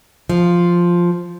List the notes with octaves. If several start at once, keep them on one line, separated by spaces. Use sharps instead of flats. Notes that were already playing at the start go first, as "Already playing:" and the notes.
F3